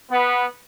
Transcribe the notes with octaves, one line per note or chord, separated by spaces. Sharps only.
B3